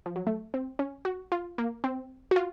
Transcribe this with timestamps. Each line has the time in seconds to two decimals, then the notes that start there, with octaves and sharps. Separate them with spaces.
0.06 F3
0.16 F#3
0.27 A3
0.54 C4
0.79 C#4
1.05 F#4
1.32 F4
1.58 A#3
1.84 C4
2.31 F#4
2.36 F4